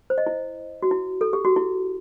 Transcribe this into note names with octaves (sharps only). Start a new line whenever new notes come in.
C5
D#5
E4
F#4
E4
A4
G4
F#4
E4